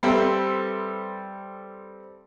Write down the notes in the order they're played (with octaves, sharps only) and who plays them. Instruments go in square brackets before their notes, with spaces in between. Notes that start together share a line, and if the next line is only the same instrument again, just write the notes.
[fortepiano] G3 C4 A4 B4 C5 E5